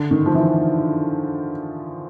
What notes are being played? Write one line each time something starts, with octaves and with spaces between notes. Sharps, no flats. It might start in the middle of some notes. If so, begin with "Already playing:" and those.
Already playing: D3
D#3
F3
E3